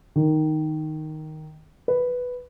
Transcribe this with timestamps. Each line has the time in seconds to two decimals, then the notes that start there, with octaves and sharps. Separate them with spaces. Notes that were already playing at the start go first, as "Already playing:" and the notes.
0.16 D#3
1.88 B4